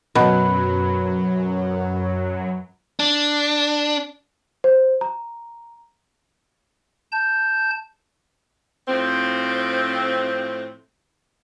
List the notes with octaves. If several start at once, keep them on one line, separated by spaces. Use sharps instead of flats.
F#2 B2 F#3 B4
D4
C5
A#5
A5 G6
A2 F3 C4